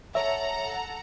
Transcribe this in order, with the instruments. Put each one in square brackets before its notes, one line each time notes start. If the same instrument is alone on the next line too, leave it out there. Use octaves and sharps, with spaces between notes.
[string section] A4 F#5 A#5 [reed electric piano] C#5 E5